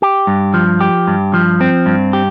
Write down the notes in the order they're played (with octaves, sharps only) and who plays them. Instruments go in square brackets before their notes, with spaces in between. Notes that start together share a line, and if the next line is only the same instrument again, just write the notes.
[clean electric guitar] G4
G2
F3
G4
G2
F3
C4
G2
G4